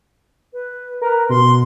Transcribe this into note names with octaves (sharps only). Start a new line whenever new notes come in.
B4
A#4 B4
B2 C6